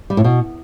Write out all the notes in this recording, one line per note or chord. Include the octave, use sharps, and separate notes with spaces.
G3
A2
B2